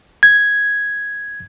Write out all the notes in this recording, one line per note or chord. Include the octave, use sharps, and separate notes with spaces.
G#6